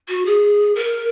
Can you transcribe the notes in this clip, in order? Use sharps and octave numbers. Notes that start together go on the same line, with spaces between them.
F#4
G#4
A#4